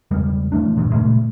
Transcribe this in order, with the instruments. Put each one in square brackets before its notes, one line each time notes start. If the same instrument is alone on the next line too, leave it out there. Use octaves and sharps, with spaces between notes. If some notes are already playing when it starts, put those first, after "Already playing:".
[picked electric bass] E2 C#3 G3 G#3
E3 A3 D4
D2 G2 A#2
A#2 C#3 G#3 A3